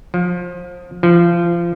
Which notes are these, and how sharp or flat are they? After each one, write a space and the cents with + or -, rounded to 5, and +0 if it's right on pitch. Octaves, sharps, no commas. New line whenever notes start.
F3 +25
F3 -25